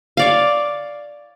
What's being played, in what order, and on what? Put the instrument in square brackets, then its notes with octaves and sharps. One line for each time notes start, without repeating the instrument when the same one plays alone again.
[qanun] C#5 D5 F5